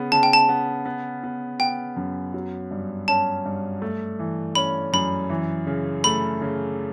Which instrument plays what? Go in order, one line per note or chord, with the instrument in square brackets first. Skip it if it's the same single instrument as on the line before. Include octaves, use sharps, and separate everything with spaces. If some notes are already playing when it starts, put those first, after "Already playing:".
Already playing: [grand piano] C#3 B3
[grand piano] C#3 [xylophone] A5
[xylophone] G5
A5
[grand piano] B3
B3
B3
[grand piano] B3 [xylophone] G5
[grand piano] F#2
F#3
G2
[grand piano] C#4 [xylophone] A5
[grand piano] G2
A3
E3
[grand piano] C#4 [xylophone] B5
[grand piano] F#2 [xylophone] B5
[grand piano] E3
C#3
[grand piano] A3 [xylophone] B5
[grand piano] C#3